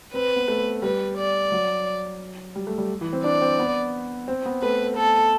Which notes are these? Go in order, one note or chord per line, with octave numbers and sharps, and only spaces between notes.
C4 B4
B3
A3
G3 B4
D5
F#3
G3
A3
G3
E3
C4
D4 D5
C4
B3
C4
B3
A3 B4
A4